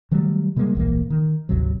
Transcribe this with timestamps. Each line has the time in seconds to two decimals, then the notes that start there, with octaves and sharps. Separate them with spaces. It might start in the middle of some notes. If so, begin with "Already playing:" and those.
0.11 D#3 F#3 G3 A3
0.56 C3 G3 G#3 A#3
0.75 D1 A#1 E3 A#3
1.10 D#3
1.49 G#1 D2 C3 F#3